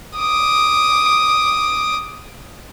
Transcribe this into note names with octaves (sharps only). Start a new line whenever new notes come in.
D6 D#6